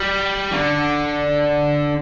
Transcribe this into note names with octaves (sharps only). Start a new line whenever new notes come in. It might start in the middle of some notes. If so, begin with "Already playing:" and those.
Already playing: G3
D3